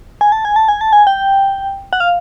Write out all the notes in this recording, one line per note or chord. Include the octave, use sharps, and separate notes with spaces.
G#5
A5
G#5
A5
G#5
A5
G#5
G5
F#5
F5